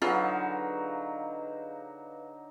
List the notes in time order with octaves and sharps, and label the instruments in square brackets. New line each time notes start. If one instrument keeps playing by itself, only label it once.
[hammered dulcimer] D3 F#3 D#4 [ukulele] F4 [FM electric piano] G#4 B4 F5